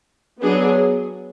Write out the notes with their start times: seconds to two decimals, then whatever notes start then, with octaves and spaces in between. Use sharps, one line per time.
0.41 F#3 B3 D4 G#4